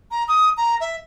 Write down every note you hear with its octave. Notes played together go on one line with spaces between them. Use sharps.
A#5
D#6
A#5
E5